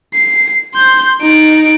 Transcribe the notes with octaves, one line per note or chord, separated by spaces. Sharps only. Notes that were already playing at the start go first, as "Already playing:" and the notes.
C7
C6 G6
D#4 D7